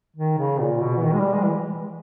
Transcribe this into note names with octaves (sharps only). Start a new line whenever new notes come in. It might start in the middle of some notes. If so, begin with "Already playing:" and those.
D#3
C#3
A#2
B2
E3
D#3
G#3
G3
G#3
E3